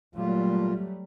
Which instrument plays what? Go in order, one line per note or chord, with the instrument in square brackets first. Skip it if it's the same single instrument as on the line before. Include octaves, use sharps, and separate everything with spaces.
[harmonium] A#2 F4 [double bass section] F#3 G3 A3